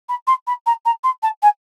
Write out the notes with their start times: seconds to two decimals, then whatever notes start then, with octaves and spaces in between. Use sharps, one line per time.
0.09 B5
0.27 C6
0.47 B5
0.66 A#5
0.85 A#5
1.04 C6
1.23 A5
1.42 G#5